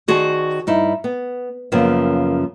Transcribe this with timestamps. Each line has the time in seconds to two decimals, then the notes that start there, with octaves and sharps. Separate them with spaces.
0.08 D#3 F#4 G#4 C5 D5 A5
0.67 G2 D#4 E4
1.04 B3
1.72 F#2 C#3 F3 A#3 B3